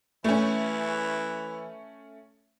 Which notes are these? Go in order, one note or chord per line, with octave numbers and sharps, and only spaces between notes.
E3 A3 C#4